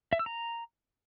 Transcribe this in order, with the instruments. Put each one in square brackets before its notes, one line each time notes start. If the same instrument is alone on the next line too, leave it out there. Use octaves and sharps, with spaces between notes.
[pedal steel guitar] E5
E6
A#5